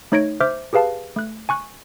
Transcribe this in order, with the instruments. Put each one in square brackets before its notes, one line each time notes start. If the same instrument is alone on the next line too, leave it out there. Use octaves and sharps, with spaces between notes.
[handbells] A3 D#4 C#5 G#6 A#6 D7
C5 E5 D6 F6 G6
G4 G#4 B4 F5 A5
A3 F#6
G#5 C#6 F#6